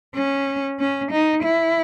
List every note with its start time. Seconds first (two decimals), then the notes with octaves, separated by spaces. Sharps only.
0.15 C#4
0.79 C#4
1.11 D#4
1.43 E4